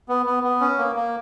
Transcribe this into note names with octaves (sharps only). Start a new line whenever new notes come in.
B3
B3
B3
C#4
A#3
A#3